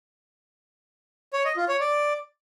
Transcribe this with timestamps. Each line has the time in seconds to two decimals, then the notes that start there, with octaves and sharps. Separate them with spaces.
1.33 C#5
1.45 D#5
1.57 F4
1.68 C#5
1.80 D5